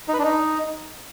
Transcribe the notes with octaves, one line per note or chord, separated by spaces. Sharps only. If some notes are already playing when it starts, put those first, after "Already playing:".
D#4
B4
D4
D#4